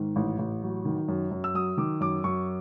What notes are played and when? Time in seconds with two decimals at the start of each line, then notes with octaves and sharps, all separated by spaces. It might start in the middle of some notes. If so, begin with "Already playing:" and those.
Already playing: G#2 D#3
0.16 A1
0.39 A1
0.63 F#3
0.85 D#3
1.08 F#2
1.31 F#2
1.44 E6
1.54 F#3 D#6
1.77 D#3 D6
2.00 F#2 D6
2.24 F#2 C#6